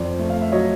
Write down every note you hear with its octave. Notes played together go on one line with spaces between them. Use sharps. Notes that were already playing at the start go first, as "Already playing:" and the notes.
Already playing: F2 C5 D5
A3
F5
E5
F#3 C#5 D#5